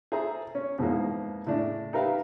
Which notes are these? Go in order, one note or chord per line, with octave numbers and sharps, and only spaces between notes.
G#4 A4 C5 E5 A#5
C#4
F2 G#2 B2 E3 G#3 A#3
A2 C#3 D4
D#4 G4 A#4 B4 E5 F5